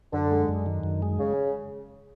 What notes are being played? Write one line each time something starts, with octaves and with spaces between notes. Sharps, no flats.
F#2 D3
G#3
F#2
D#3
F#2
G#3
C#3